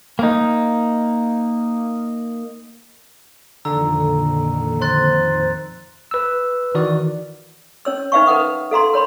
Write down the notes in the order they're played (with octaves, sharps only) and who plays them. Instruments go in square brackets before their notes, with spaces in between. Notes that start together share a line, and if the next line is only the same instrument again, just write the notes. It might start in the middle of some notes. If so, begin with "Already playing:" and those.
[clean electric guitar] A#3 D#4
[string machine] F2 A#2 D#3 [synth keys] D3 [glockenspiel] A#5 E6
[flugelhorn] C5 [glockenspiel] C6 F#6 A6
[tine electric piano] B4 E6
D#3 E3 F#4 D5
[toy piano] C#4 C#5 E6
D#4 B4 E5 F5 G5 C#6
A#4 B4 F#5 D#6
A4 F5 A#5 C6
A#4 C#5 B5 C6